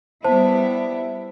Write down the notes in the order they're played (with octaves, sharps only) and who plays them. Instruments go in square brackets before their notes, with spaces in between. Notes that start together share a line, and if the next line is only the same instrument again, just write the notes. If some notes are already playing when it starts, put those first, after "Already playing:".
[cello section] G3 B3 E4 [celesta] C5 A5